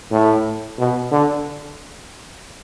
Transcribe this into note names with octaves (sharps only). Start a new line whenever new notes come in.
A2
B2
D3